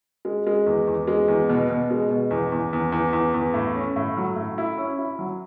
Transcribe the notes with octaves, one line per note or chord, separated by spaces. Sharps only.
G#3
G#3
E2
E2
G#3
E2
B2
B2
G#3
B2
E2
E2
E2
E2
E2
E2
A2
C#4
A2
F#3
A2
E4
C#4
E4
F#3